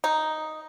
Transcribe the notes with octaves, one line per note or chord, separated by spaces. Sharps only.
D#4